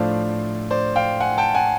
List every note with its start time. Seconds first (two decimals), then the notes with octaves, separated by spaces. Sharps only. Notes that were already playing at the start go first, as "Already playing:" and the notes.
Already playing: A2 F3 A3 D4 F4 C5 D5
0.71 C5 D5
0.96 F5 G5
1.20 F#5 G#5
1.38 G5 A5
1.55 F#5 G#5